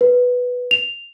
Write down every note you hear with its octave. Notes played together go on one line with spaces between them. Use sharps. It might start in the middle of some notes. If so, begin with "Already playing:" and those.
B4
F7